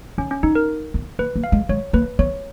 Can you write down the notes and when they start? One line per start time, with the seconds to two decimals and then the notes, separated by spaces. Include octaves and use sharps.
0.18 C#4 D#4
0.31 C#4
0.43 C#4 D#4
0.55 A#4
0.94 B3
1.19 A#3 B4
1.36 A#3
1.44 F5
1.52 G#3
1.69 G#3 C#5
1.93 A#3 B4
2.19 B3 C#5